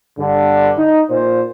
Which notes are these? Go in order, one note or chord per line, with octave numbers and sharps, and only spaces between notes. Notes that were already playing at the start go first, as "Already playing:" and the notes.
G2 D3
D#4
A#2 C5